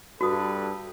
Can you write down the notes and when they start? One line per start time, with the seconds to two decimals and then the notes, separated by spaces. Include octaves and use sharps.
0.21 G2 F#4 A4 B4 D#6